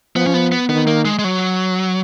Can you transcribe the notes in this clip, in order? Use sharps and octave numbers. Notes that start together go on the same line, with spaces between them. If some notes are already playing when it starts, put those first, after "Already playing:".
F3 B3
C#4
B3
B3
D#3 B3
A#3
G#3
G#3
F#3